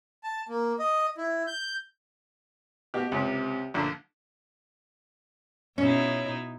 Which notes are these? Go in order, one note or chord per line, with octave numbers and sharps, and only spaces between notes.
A5
A#3
D#5
E4
G6
B2 G4
C#2 C3
A#1 D3
B2 C#4 D#4 E4